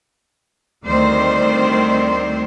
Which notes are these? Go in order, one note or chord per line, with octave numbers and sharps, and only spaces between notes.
D2 D#3 G3 C4 C5 D5